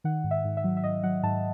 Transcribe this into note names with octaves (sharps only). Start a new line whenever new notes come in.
D#3 F#5
G#2
E5
G#2
E5
F#3
E5
G#2 D#5
F#3 F#5
G#2 A5